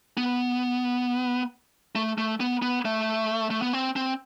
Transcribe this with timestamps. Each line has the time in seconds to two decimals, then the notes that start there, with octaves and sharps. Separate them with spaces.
0.17 B3
1.95 A3
2.18 A3
2.40 B3
2.62 B3
2.85 A3
3.50 A3
3.62 B3
3.73 C4
3.96 C4